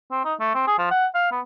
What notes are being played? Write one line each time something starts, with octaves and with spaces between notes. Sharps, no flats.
C4
D#4
A3
C4
G#4
F3
F#5
F5
B3